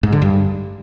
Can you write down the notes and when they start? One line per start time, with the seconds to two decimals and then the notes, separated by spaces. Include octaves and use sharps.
0.03 G#2
0.12 D3
0.22 G2